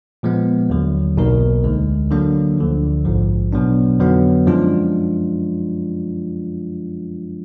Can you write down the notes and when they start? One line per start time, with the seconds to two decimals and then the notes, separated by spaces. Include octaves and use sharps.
0.23 A#2 F3 G#3 B3
0.70 D#2 D3 F#3
1.17 B1 B2 A#3 D#4 A#4
1.64 D2 D3 G#3
2.11 D3 F#3 A#3 D4
2.58 D2 D3 F3
3.05 A#1 G#2 F3
3.52 B2 F#3 B3 D4
3.99 F2 D3 F#3 B3 D#4
4.46 F#2 F3 G#3 D4 F4